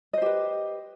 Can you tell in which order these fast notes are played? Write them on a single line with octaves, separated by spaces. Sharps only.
D#5 C5 G4 B4